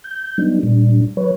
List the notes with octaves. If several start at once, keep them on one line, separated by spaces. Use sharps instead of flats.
G6
F#3 G3 B3 D4 D#4
A#2 G3 D4
F#3 B4 C#5